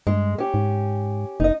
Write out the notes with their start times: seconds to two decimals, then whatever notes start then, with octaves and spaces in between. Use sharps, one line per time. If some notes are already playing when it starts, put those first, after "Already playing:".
0.07 G2 G#3
0.38 C#4 G4
0.54 G#2
1.40 F1 D#4 D#5